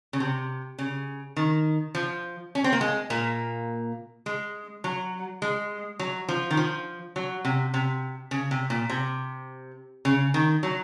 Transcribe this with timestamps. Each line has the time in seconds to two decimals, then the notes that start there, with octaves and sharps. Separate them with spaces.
0.13 C#3
0.20 C3
0.79 C#3
1.36 D#3
1.95 F3
2.55 C#4
2.64 C4
2.73 A#3
2.81 G#3
3.10 A#2 A#3
4.26 G#3
4.84 F#3
5.42 G#3
5.99 F#3
6.29 F3
6.51 D#3
6.57 F3
7.16 F#3
7.45 C3
7.74 C3
8.31 C#3
8.51 C3
8.70 A#2
8.90 C3
10.05 C#3
10.34 D#3
10.63 F#3